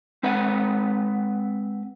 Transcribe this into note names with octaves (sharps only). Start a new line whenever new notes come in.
G#3 C4 B4 F#5